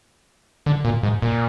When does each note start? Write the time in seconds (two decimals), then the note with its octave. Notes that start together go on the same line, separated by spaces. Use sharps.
0.66 D3
0.85 A#2
1.03 G#2
1.22 A#2